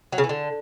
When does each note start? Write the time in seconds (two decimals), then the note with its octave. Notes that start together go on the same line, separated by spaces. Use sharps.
0.12 F#3
0.18 C#3
0.24 E3
0.29 D3